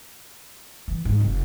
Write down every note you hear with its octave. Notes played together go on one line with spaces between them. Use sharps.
E3
G#2
F1